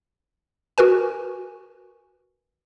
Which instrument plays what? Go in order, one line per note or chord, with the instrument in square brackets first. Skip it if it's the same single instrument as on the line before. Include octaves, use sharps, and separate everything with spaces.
[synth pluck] F#4 A#4 B4 G#5